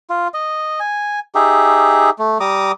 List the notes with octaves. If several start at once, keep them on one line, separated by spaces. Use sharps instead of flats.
F4
D#5
G#5
D#4 G4 G#4 E5
A3
G3 A#5 D6 D#6